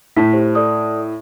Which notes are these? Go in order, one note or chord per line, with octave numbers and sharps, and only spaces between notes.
A2 B6
G4 C5
A4 D5 D#6